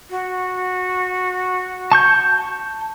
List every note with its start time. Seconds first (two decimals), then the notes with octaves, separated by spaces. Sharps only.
0.10 F#4
1.92 A5 C#6 G6